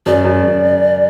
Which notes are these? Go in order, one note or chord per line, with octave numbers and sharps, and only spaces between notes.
F#2 D5
F#2
F#2